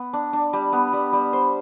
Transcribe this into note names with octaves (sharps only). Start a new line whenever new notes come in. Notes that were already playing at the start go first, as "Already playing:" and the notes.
Already playing: B3
D4
D4
G3
B3
G3
G3
C5